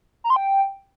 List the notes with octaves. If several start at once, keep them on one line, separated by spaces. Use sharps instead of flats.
A#5
C6
G5